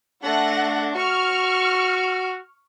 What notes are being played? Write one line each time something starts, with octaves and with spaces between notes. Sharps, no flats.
A3 D4 F#5 A#6
F#4 C#6 F6